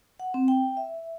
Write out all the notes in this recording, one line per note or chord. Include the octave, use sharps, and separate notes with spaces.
F#5
C4
G5
E5